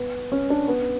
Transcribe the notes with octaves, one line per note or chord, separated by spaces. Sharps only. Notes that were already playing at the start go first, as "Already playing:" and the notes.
Already playing: B3
C#4
D4
B3